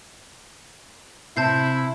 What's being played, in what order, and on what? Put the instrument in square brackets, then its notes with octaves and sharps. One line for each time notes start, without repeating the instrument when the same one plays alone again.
[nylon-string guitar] C3 [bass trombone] E4 [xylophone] A5 G6 C7